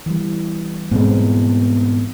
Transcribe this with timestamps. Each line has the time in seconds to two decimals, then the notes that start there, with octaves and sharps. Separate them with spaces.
0.06 E3 G3
0.91 G#2 B2 G#3 B3 C4